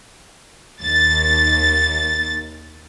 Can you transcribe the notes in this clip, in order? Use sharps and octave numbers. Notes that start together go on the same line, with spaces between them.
D#2 A6